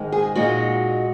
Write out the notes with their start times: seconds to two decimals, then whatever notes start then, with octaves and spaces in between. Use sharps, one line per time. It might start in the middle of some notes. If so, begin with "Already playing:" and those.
Already playing: G#2 D#3 G#3 D#4
0.12 G#4
0.35 A#2 G#3 D#4 F#4